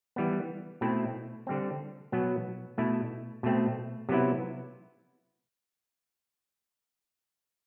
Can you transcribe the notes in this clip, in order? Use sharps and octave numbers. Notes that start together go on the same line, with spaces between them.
E3 G3 B3
B2 A3 C4 E4
D3 G3 C4
B2 F#3 B3
B2 A3 E4
B2 A3 C4
C3 F#3 B3 E4